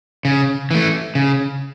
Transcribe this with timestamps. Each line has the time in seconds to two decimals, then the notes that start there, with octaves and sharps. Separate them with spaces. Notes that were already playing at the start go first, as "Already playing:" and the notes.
0.25 C#3
0.71 E3 A3
1.15 C#3